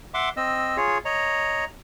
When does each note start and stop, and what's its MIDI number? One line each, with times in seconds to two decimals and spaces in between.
0.14 0.29 76
0.14 0.29 78
0.14 0.29 84
0.14 0.29 86
0.37 0.77 60
0.37 0.77 75
0.37 0.77 88
0.77 0.98 65
0.77 0.98 68
0.77 0.98 73
1.05 1.65 73
1.05 1.65 75
1.05 1.65 82